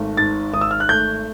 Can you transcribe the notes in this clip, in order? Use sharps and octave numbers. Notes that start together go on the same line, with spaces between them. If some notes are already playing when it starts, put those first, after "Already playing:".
Already playing: G#1 A3
G#2 A6
G#1 D#6
E6
F6
F#6
A3 G6